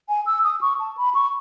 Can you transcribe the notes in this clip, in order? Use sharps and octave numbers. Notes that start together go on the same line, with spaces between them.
G#5
E6
D#6
C#6
A5
B5
C#6